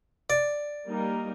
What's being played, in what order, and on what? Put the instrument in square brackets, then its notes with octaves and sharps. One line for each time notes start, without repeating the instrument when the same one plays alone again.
[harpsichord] D5
[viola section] G3 A#3 D#4 A#4